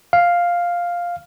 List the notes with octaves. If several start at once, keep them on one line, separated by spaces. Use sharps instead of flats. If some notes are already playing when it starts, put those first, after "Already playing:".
F5